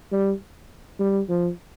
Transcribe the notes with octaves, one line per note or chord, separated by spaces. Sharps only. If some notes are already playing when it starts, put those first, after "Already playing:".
G3
G3
F3